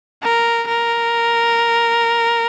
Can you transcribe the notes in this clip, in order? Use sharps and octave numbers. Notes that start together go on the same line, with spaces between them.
A#4
A#4